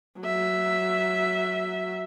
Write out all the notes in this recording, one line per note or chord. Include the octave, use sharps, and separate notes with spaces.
F#3 E5